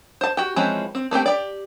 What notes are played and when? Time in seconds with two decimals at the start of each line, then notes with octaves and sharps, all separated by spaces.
0.21 C5 A5
0.37 F#4 G4
0.56 E3 F3 G#3 C4 C#4
0.95 C4
1.11 A3 A#3 C4 G4
1.26 G4 D5